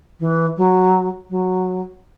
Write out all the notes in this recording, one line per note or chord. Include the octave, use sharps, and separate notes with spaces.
E3
F#3
F#3